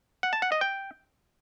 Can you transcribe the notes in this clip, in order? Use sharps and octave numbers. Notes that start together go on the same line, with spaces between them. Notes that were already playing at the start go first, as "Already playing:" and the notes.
F#5
A5
F#5
D#5
G5